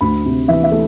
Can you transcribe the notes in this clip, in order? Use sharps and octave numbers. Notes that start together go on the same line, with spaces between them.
D2 B5
C3
E3 E5
E5
A3